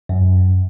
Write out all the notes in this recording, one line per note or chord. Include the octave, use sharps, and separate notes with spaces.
F#2